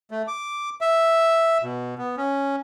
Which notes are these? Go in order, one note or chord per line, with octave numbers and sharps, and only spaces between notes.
A3
D6
E5
B2
B3
C#4